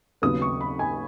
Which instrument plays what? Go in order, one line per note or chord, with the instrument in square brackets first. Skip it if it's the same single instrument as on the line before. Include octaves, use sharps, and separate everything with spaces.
[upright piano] D#2 C#3 F#3 B3 D#6
C#6
B5
G#5